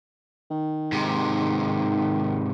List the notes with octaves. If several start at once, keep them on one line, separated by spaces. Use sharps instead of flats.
D#3
G#2 C3